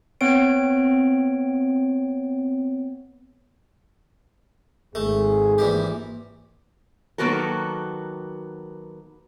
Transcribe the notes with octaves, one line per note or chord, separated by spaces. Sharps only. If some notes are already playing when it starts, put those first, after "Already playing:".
B3 C4 C#5 D7
G#1 A3 G#4
A#1 E3 G4
D#3 F#3 A#3 B3 F#4 A4